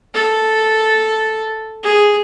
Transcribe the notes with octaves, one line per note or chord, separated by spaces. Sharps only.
A4
G#4